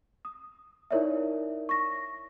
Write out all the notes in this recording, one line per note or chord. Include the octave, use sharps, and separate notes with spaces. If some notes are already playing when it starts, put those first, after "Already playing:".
D#6
D#4 E4 A#4 C#5 D5 E5
C#6 A#6